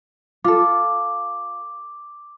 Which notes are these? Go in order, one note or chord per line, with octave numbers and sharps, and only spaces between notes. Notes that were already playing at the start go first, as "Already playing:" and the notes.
F4 A4 D6